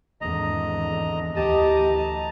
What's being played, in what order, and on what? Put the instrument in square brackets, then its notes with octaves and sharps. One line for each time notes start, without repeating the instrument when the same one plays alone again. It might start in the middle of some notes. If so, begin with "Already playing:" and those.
[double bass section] G#1 E2 D3 [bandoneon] D#5 A#5
[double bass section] D2 E3 [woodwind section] G4 [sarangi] D#5 [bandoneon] A5 A#5